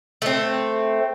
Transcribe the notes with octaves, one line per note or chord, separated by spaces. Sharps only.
A3 C4